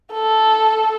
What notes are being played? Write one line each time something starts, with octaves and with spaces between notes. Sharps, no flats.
A4